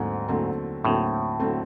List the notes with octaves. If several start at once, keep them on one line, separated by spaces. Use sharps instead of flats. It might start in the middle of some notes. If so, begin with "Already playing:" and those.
Already playing: D#2 G#2 D3 F#3 A3 C4
D#2 D3 F#3 A3 C4
D#2 A2 D3 F#3 A3 C4
D3 F#3 A3 C4